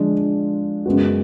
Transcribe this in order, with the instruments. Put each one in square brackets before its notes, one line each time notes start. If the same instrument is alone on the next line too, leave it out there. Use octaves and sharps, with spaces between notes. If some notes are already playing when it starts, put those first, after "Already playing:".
Already playing: [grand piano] D3 F3 G#3 D4
F#2 C#3 G#3 B3 F#4